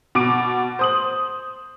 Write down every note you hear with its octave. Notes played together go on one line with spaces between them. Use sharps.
B2 D6 D7
C5 D#6 F#7